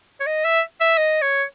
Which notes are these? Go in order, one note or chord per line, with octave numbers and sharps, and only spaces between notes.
C#5
D#5
E5
E5
D#5
C#5